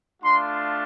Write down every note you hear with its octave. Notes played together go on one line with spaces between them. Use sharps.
A3 D4 F4 C6